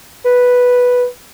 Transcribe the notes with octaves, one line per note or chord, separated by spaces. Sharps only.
B4